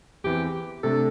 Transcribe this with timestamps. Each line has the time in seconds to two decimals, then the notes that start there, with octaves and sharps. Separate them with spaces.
0.24 E2 E3 C4 G4
0.83 C3 A3 D4 A4